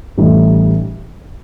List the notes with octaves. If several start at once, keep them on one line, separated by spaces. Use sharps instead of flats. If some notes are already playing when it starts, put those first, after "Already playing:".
A1 A2 E3 G3 D#4